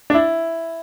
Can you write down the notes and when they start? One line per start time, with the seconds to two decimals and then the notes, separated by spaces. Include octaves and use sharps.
0.10 D4
0.14 E4